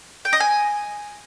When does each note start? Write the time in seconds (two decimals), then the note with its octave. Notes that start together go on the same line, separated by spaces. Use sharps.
0.25 G5
0.33 D#5
0.40 G#5